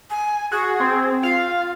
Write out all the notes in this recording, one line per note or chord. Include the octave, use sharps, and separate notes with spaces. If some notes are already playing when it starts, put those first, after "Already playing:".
G#5
F#4 G#4
C4
F4 F5